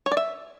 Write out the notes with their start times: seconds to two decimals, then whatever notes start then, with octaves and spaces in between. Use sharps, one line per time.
0.06 C#5
0.12 D5
0.17 E5